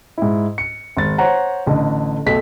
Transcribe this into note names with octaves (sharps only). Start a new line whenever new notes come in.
G#2 E4
C#7
G#1 A6
C5 C#5 F#5 A#5
A1 D3 D#5
B1 A3 B6